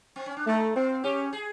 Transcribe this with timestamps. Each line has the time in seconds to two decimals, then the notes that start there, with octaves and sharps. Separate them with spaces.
0.16 C4
0.26 C#4
0.37 D4
0.47 A3 D#4
0.75 C4 F4
1.04 C#4 G4
1.33 G#4